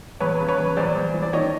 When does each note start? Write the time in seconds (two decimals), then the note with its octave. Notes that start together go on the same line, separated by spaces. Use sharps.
0.20 E2 B4 C#5
0.40 C#3
0.48 B4 C#5
0.58 E2
0.77 E2 C5 D5
0.95 E2
1.14 E3
1.22 D5
1.33 D#3 C#5 D#5